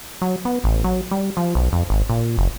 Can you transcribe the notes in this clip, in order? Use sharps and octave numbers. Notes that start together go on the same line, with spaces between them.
F#3
B3
A1
F#3
G3
F3
B1
F2
G#1
A#2
F#1